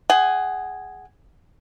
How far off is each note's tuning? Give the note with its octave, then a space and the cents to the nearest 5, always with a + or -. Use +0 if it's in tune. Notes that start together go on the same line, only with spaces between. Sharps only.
G#4 +0 F#5 +20